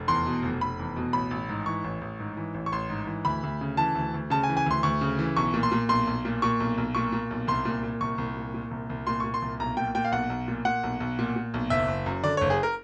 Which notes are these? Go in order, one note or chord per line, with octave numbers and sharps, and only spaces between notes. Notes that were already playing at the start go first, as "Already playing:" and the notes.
Already playing: F1
E2 C6
B2
F1
F1 B5
E2
B2
A1 B5
A1
G#2
E3 C#6
A1
A1
G#2
E3
A1
C#6
A1 C6
G#2
E3
D2 B5
D2
C#3
E3 A5
D2
D2
C#3 A5
G#5
E3
G#5
D2 C6
D2 C#6
C#3
E3
B1 C#6
A#2
C6
A#2
B1 C6
B1
A#2
A#2 C#6
B1
B1
A#2 C#6
A#2
B1
C2 C6
A#2
A#2
C2 C#6
C2
A#2
A#2
C2
C2
A#2 C6
A#2 C#6
C6
C2
B1 A#5
A#2 G5
A#2 G5
F5
B1 F#5
B1
A#2
A#2 F#5
B1
B1
A#2
A#2
B1
F#1 E5
F#1
F#2
D3 D5
F#1 C#5
G#4
A#4